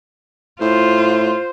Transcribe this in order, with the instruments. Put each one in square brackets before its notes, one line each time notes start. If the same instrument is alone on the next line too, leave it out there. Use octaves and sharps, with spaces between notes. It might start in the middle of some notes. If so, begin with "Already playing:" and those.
[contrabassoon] A2 [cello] F4 [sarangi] C5